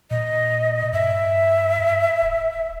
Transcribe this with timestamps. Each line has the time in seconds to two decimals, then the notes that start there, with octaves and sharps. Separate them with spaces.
0.11 A#2 D#5
0.93 G2 E5
2.22 D1